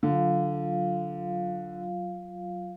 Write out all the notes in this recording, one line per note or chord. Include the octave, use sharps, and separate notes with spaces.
D3 F#3 F4 F5